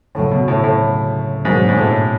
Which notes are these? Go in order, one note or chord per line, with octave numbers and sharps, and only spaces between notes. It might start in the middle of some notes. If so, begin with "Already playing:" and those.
D2 A2 C#3 F#3 A3
B2
A2
A2
G#2 B2 F#3 A#3 D4
G#2
A2